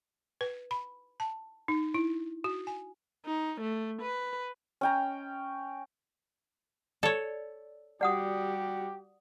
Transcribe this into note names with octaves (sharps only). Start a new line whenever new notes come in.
B4
B5
A5
D#4
E4
F#4
G#5
D#4
A3
B4
C#4 G5 A#5
A4 C#5 D5
G3 F#4 G4 D5 F#5 D#6